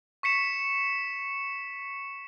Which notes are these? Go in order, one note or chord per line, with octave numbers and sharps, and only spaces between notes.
C#6 B6 C#7 E7